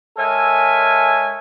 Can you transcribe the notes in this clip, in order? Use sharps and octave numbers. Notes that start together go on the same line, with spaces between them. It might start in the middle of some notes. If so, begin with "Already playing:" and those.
G#3 A4 A#4 C#5 E5 G#5